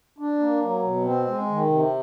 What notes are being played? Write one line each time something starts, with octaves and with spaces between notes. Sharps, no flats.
D4
A#3
F#3
B2
C4
G#3
D#3
C3